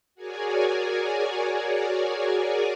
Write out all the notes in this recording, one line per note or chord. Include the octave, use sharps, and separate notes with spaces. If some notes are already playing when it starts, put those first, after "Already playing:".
F#4 G#4 A#4 C#5 D5 G#5